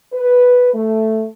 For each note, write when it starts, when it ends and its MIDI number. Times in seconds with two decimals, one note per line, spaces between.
0.13 0.71 71
0.74 1.26 57